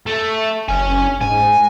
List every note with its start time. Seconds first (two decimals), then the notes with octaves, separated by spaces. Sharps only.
0.06 A3
0.69 F#1 C#4 G#5
1.21 G#2 G#5